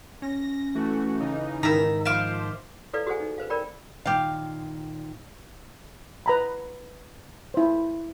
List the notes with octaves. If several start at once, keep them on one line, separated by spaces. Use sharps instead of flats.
C#4 A#6
E3 A3 F#4
C#3 E3 D#4
G#2 D#3 E5 A#5
F3 C5 E5 F5 D6
E4 A4 B4 D5 F5
F#4 G#4 A4 C5 F#5 G#5
D#4
B4 C5 F5
A#4 D5 G5 B5
A#2 D#3 G4 F5
B4 A#5 B5
E4 C5